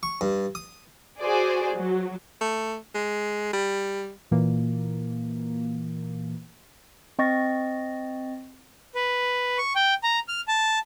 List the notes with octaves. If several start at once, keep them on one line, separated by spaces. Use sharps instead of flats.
C#6
G2
D#6
F#4 G#4 C5 D5
F#3
A3
G#3
G3
A#2 E3 A#3
C4 D#5 C#6 A6 A#6
B4
C#6
G5
A#5
F6
A5